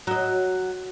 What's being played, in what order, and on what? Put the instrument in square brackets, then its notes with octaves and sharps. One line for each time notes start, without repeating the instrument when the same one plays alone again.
[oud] F#3 D#5